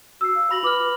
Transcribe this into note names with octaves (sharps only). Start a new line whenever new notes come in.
F#4 E6 C7
F5
F#4 B5 A#6 F#7
F4 B4 D6 F6 F#7